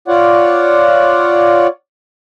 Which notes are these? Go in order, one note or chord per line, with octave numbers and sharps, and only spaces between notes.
F4 C#5 D5 F#5